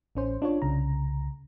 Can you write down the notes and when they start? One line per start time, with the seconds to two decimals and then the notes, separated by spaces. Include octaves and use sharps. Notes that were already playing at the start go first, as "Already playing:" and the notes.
0.15 A1 C#4 C5
0.42 D4 F4 C#5
0.62 C2 C#3 A#5